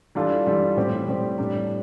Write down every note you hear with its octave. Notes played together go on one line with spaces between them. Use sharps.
E3 G3 D4 F4 A4
E3 G3 D4 F4 A4
A2 G3 C4 G4
A2 G3 C4 G4
A2 G3 D4 G4